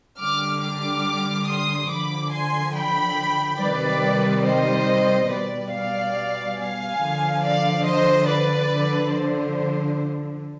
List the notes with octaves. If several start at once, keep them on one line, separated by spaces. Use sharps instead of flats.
D3 G3 D6 F6
D6 F6
C6 D#6
D3 F3 B5 D6
G#5 C6
G5 B5
C3 D#3 G3 B4 D5
C5 D#5
B2 G3 B4 D5
D5 F5
F5 G#5
D3 F3
D5 F5
C5 D#5
B4 D5
D3 F3
C5